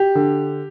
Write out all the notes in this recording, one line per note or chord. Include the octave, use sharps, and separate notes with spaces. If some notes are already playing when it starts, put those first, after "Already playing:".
Already playing: G4
D3